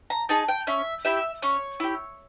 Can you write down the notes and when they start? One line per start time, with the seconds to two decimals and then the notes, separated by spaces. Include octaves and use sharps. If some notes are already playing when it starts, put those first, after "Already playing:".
0.10 A#5
0.29 D#4 G#4 A5
0.48 G5
0.67 C#4 E5
1.05 E4 G4 E5
1.42 C#4 C#5
1.80 E4 G4